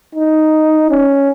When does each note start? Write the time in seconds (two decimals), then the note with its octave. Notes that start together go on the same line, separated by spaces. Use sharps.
0.15 D#4
0.90 C#4